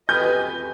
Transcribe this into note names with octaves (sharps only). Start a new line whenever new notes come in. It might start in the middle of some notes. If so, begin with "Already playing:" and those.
G4 B4 D#5 G#5 G6